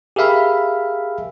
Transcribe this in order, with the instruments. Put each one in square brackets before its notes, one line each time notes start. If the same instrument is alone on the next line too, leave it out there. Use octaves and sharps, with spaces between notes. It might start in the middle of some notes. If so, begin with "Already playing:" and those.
[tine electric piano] G4 G#4 A#4 E5 F5 B5